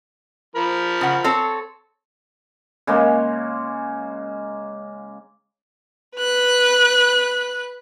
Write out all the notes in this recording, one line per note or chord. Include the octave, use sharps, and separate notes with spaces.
F3 A#4 B5
C#3 F#5
C4 A4 C#5
C#3 G#3 A#3
B4 F#6